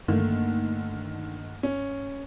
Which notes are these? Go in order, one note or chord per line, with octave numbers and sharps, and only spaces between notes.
G2 D3 D#3 A3 A#3
C#4